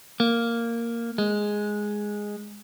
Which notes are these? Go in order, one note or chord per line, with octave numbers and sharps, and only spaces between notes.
A#3
G#3